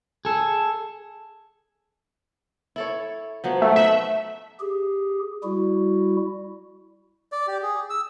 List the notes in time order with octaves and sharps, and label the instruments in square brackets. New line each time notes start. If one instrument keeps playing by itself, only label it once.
[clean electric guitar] G#4 A4
[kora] E4 A4 C#5
F3 F#3 B3
[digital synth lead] A3
[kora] A3 D#4 F#5 [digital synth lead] E5
[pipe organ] G4 G#4
G3 E4 F#4
[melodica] D5
G4
G#4
E6